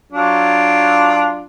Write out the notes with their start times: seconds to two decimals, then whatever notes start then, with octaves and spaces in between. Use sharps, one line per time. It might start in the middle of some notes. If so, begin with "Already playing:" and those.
0.13 F#3 D4 F4